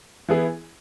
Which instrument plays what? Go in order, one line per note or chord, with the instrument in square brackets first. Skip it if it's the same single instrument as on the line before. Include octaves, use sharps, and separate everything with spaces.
[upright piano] E3 B3 E4 G#4